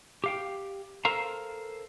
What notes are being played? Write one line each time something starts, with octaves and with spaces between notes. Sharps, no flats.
G4 F5 G5
A4 A#4 C5 F5 A#5